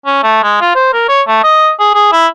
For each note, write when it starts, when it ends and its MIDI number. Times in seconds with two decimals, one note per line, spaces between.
0.06 0.18 61
0.23 0.41 57
0.43 0.56 56
0.61 0.71 65
0.75 0.93 72
0.94 1.08 70
1.08 1.22 73
1.28 1.43 57
1.43 1.71 75
1.80 1.92 68
1.94 2.10 68
2.12 2.27 64